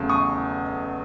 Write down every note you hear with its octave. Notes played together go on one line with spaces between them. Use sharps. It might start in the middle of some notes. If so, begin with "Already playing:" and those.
Already playing: E2 C#3 F#3 A3
C#6 D#6